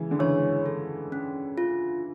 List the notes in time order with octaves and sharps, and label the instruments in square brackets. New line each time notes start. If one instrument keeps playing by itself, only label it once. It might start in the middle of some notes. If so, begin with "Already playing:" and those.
Already playing: [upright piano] C#3 E3
D3
[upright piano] C#3 E3 [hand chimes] C#5
[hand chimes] A4
C#4
F4